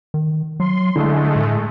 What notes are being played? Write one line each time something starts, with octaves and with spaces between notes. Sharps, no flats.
D#3
F#3 C6
D3 G#3 A3 E4
A2